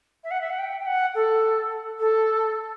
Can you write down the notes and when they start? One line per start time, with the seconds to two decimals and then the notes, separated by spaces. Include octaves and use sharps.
0.24 E5
0.31 F#5
0.41 E5
0.50 F#5
0.58 G5
0.80 G5
0.86 F#5
1.15 A4
1.99 A4